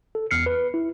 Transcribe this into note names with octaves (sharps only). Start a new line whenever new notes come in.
A4
E2 F6 C7 C#7
B4
E4